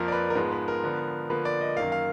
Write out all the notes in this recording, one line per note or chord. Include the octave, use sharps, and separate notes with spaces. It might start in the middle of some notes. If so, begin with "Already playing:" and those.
Already playing: F2 F3 A#3 A#4
D5
B4
A#4
G#2 F3 G#3 B3 B4
B4
A#4
D3 F3 B3
D3 F3 A#3 B4
D5
D#5
F#2 D#3 A#3 F5
F5